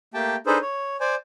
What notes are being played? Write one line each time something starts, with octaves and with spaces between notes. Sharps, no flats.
A3 A#3 G4 G5 A5
D4 D#4 G#4 A4 B4 C5
C#5
C5 D5 G#5